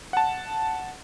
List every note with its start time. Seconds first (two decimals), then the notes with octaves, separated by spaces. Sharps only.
0.13 F#5 A5